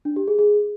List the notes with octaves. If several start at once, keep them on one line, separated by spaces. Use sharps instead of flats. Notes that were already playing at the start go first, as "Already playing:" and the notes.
D4
G4
G#4
G#4